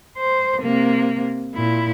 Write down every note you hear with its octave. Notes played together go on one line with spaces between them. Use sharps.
C5
C3 A#3
A#2 E4